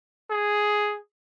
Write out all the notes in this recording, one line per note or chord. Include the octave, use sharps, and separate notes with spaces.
G#4